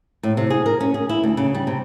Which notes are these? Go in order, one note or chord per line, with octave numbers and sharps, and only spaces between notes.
A2
C3
G#4
A#4
C#4
G#4
E4
D2
C#3
G3
C3